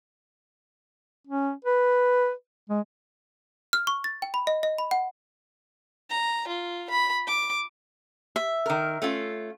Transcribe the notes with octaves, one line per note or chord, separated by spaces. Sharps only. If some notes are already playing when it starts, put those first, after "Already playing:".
C#4
B4
G#3
F6
C#6
A6
G5
B5
D#5
D#5
B5
F#5
A#5
F4
B5
D6
E5
D#3 A#4
A3 C#4 F4